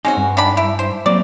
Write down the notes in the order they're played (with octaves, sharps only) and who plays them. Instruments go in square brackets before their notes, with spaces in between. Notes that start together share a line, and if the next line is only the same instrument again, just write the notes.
[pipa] G#3 C#4 F#4 [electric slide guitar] C4 D#4
[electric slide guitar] G2
[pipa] D#3 D4 B5
E4
C5
[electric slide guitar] F#3 A#3 C4 [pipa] D5